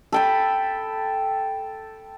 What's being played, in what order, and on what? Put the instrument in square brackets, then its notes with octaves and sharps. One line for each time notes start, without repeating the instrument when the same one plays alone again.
[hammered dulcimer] A4 G5 B5